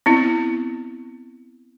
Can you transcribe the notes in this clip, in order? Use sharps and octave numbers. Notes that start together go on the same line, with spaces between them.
B3 C4 E4